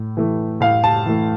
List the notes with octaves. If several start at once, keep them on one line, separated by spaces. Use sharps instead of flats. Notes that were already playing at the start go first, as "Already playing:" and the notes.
Already playing: A2
E3 A3
A2 F5
A5
E3 A3